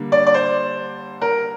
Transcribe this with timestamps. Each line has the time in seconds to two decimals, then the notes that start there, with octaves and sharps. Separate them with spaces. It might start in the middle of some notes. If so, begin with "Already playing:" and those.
Already playing: D3 G3 A#3
0.12 D5
0.26 D5
0.34 C5
1.21 A#4